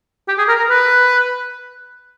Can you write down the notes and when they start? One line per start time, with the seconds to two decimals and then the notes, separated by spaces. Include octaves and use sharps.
0.28 G4
0.38 G#4
0.48 A#4
0.59 A#4
0.69 B4